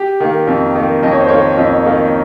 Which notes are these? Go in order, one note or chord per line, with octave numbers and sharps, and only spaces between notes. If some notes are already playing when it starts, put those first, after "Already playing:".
Already playing: G4
D#3 A#3
F2
D#3 A#3
F2 D#5
C#5
C5
D#3 A#3 C#5
F2 D#5
D#3 A#3